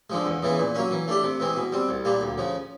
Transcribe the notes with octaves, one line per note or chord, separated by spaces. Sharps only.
D3 F3 G#3
E2
C#3 E3 G#3 B3
A#2
F#3 A#3 C#4
E3
A3 D4 G4
C3
E3 G#3 C4
B2
G3 C4
C2
A#2 G3 A#3
D2
C#3 F3